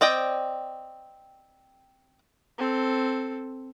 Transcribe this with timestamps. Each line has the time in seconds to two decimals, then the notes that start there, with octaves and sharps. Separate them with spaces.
0.01 C4 D5 D#5 G5
2.59 C4 A4